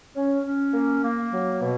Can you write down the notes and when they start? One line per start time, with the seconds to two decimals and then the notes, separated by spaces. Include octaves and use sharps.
0.16 C#4
0.44 C#4
0.74 A#3
1.03 A#3
1.32 F#3
1.62 B2